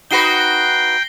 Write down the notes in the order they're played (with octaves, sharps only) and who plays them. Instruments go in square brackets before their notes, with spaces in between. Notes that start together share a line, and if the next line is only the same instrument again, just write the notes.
[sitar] D#4 F#4 B4 [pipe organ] G5 [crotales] A#6 C7 G7